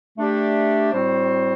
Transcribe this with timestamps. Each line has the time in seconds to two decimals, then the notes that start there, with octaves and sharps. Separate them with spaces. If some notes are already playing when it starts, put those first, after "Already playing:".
0.17 A3 D4 G4 D5
0.92 A2 G3 C4 F#4 C5